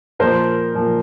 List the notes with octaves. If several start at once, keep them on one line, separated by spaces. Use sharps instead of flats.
A#2 F3 A#3 A#4 C5
A#2 F3 A#3